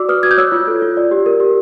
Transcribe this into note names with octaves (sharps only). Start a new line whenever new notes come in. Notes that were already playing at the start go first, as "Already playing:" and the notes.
Already playing: F#4 D5 D6 E6
B4 D#6 F6
F#4 G#6
G6
C#5 E6 F#6
F4
A4
F4
D5
G4
A#4
G4